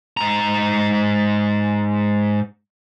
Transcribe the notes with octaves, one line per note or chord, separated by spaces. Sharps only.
G#2 A#5